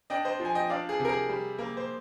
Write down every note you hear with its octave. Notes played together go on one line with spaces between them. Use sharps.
D4 D#5 G5
C5 D#5
F3
G#5
D#5 G5
D4 D5 F5
G#4
C3
A#4
G#4
G3
A#3
C5